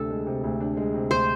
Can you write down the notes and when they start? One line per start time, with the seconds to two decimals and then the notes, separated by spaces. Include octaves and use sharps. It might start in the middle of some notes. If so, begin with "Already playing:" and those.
Already playing: D2 C3 D4 A4
0.10 G#3
0.27 C3
0.44 D2
0.60 D4
0.77 G#3
0.94 C3
1.11 D2 C5